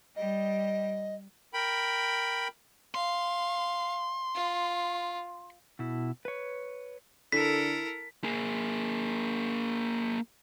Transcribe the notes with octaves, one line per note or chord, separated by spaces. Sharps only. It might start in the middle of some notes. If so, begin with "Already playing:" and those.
G3 D#5
A#4 G5 B5
F5 C6
F4
B2 E4
B4 C#5
D3 E4 A4 A#4 B6 D7
A#3 G#4